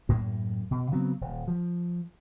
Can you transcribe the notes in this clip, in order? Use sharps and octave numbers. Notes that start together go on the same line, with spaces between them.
F#2 A2 A#3
B2
C#3 F#3 B3 C4
D#1
F3